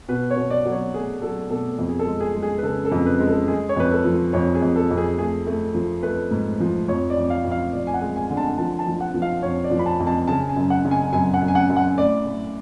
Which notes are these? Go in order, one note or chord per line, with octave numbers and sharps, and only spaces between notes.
B2 B4
C#5
B2
D5
F#3
C#5
A3 G#4
F#3 A4
B2 A4
F2
G#4
A4
G#3
G#4
G#3
G#4
B4
C#3 A4
A4
F2
B4
G#3
A4
G#3 G#4
C#5
F2 B4
A4
F3
F2 C#5
G#4
F2
A4
F2
G#4
A3 G#4
A3
F3
A3 B4
G#2
F3
F2 C#5
D5
F2
F5
F2
F5
F2 D5
G#5
F#5
G#3
G#5
D3
A5
F3 A5
A5
F3
F#5
F3
F5
F2 C#5
D5
F3
B5
A5
F2
A5
C#3 A5
G#5
F#2
F#5
C#3
G#5
F#2 G#5
F#5
F#2
G#5
F#5
F#2
F#5
A2 D5
A2